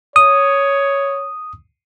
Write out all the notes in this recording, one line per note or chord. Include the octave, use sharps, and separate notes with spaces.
C#5 D#6